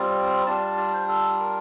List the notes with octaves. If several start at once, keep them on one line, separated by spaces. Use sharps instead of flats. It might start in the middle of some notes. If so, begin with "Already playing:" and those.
Already playing: G3 C4 F4
G3 D4 F4 A5
A5
A5
C5
A4
A#4